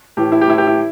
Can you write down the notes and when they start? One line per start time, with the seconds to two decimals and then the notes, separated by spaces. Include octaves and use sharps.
0.17 A2 E3 G4
0.32 E4
0.41 G4
0.47 A2 E3 E4
0.58 G4
0.67 E4